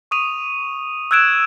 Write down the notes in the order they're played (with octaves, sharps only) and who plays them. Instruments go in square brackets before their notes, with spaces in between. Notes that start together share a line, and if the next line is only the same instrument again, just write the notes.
[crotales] C#6 D#6 D#7 F7
E6 F#6 G#6 D7 E7